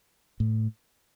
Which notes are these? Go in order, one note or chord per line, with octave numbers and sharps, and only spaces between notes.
A2